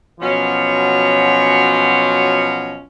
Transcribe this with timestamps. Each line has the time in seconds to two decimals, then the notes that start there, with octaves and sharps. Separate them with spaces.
0.20 B2 F3 F#3 C#4